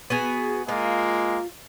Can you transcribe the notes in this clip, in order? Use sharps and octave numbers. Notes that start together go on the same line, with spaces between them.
B3 F#4 G#4
G#3 A#3 F4